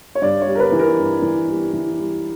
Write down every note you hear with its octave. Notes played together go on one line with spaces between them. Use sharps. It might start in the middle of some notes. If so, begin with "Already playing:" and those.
C#5
G2 D5
C#5
G3
A#4
B4
E3
A#4
G2
E3
G3
E3
G3